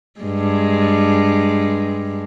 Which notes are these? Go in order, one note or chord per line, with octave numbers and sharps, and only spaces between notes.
G2 G#3